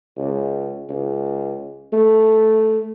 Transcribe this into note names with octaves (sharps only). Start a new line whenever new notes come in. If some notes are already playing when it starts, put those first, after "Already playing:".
C#2
C#2
A3